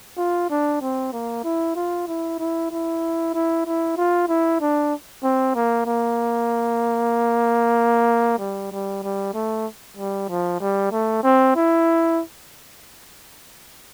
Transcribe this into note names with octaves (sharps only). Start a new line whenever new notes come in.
F4
D4
C4
A#3
E4
F4
E4
E4
E4
E4
E4
F4
E4
D4
C4
A#3
A#3
G3
G3
G3
A3
G3
F3
G3
A3
C4
E4